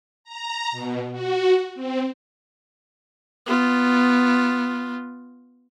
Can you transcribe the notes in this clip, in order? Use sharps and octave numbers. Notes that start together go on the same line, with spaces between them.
A#5
B2
F#4
C4
B3 F4